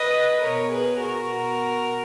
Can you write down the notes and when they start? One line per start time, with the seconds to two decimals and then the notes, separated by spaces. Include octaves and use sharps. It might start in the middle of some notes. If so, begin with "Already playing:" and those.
Already playing: B4 D#5
0.42 B2 A#4 C#5
0.71 G#4 B4
1.02 F#4 A#4
1.31 B2